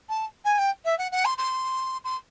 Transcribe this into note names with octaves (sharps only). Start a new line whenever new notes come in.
A5
G#5
G5
E5
F#5
F#5
C6
C6
C6